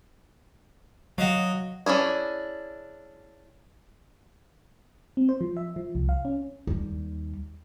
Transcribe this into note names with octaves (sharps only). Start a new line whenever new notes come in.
F#3 F#4 D#5 F5
C#4 D4 E4 G#4
C4
C5
F3
E5
F3
C2
F5
C#4
D#2 G3